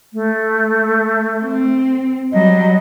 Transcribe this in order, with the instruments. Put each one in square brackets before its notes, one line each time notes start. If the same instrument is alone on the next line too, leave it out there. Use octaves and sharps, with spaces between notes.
[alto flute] A3
[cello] C4
[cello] F#3 G3 [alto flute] D#5